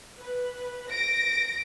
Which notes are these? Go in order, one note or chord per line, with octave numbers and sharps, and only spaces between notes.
B4
A#6 D7